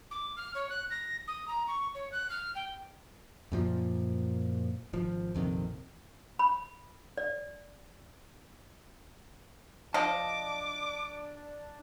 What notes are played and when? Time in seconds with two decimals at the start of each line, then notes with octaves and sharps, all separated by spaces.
0.11 D6
0.36 F6
0.55 C#5
0.69 F#6
0.90 A#6
1.27 D#6
1.48 A#5
1.68 C#6
1.95 C#5
2.12 F#6
2.30 F6
2.55 G5
3.52 F#2 A#2 F3
4.93 G#1 F3
5.34 A#1 F2 C3 D#3
6.39 B5
7.18 D5
9.94 F3 D4 D#5 A5 D6